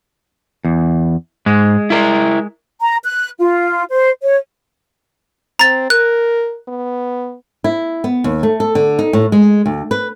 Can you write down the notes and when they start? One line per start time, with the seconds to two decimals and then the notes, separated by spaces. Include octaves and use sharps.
0.65 E2
1.46 G#2 G#3
1.90 E4 A#4
2.81 A#5
3.04 F#6
3.39 F4
3.91 C5
4.22 C#5
5.59 C4 A#5 A6
5.90 A#4 F#6
6.68 B3
7.64 E4
8.04 B3
8.24 D#2
8.43 A3
8.60 A4
8.75 D3
8.99 D#4
9.13 A2
9.32 G#3
9.66 D2
9.91 B4